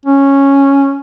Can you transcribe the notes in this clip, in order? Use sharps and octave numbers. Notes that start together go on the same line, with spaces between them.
C#4